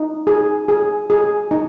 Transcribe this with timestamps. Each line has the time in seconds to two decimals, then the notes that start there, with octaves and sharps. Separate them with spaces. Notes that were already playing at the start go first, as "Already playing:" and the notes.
Already playing: D#4
0.27 G#4
0.68 G#4
1.10 G#4
1.51 D#4